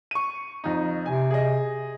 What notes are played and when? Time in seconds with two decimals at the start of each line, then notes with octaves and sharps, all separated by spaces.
0.11 C#6 D#7
0.64 F2 D#4
1.06 C3 G#5
1.30 G#4 D#5